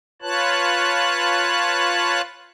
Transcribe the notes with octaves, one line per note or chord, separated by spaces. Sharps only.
F4 B4 C#5 A5 F#6